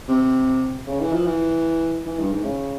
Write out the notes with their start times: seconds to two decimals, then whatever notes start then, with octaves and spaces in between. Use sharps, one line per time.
0.09 C3
0.87 C#3
1.01 E3
1.13 F3
1.26 E3
2.05 E3
2.19 G2
2.32 G#2
2.44 C#3